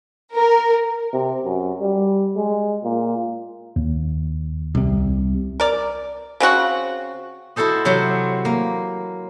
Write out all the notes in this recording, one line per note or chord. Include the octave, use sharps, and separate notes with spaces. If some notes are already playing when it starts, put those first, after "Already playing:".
A#4
C3
F#2
G3
G#3
A#2
D#2
C2 C3
A#4 D5
C#3 C4 F#4 F#5
E4 F#4 A4 C5 D#5
C3 F#3 F#4 C5
A#3